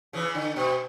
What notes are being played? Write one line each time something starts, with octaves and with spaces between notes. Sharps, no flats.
C#3 E3
D3
B2